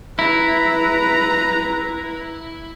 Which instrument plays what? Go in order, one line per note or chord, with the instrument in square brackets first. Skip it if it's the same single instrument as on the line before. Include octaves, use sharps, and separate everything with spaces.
[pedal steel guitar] E4 [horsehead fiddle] B4 A#5